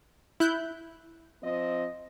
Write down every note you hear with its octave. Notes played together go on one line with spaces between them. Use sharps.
E4 F#6 G6
F3 C4 D#5